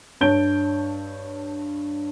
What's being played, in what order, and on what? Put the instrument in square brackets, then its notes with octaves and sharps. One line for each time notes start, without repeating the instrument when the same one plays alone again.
[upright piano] G2 C#5 A5 G6 D7 G7